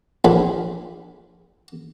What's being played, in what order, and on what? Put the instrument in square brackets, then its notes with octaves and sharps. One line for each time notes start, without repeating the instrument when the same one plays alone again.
[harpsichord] A#1 B5